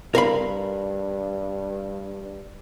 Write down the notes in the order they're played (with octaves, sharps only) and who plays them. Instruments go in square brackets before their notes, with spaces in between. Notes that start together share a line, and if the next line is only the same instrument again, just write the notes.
[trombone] G2 [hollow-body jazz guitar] A#4 F5 B5